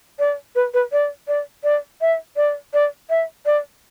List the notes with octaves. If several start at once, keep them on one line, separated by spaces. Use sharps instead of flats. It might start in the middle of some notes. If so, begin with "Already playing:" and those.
D5
B4
B4
D5
D5
D5
E5
D5
D5
E5
D5